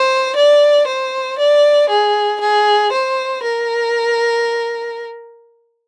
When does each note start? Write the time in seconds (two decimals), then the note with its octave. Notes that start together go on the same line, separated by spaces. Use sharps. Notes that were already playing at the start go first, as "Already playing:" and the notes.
Already playing: C5
0.36 D5
0.87 C5
1.39 D5
1.89 G#4
2.41 G#4
2.92 C5
3.43 A#4